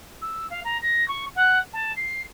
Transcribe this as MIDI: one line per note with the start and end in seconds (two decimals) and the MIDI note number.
0.22 0.49 88
0.50 0.61 77
0.65 0.78 82
0.82 1.06 94
1.08 1.26 85
1.36 1.59 78
1.73 1.93 81
1.97 2.22 96